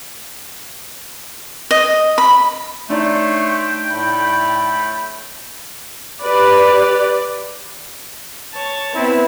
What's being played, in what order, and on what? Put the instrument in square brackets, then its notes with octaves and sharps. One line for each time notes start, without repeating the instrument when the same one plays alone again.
[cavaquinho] D#5
B5
[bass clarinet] A3 [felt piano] D4 D#4 D5 [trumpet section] C#5 C6 [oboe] G5
[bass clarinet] A2 [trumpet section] A3 B5
[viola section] G4 B4 D5
[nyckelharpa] C#5 A5
[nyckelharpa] B3 C4 [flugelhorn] E4